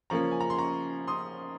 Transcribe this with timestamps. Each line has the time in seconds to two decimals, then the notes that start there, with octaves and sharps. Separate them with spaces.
0.10 C#3 F3 A#3 C#4 A#5 C#6
0.31 G#5
0.40 A#5
0.50 C6
0.58 A#5 C#6
1.07 C6 D#6